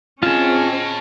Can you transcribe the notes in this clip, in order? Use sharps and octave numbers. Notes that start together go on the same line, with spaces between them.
C4 C#4 F4 G#4 D#5 A5